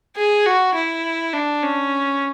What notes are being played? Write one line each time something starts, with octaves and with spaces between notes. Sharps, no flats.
G#4
F#4
E4
D4
C#4